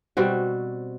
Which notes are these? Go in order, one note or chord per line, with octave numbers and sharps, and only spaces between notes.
B2 G3 C4 F#4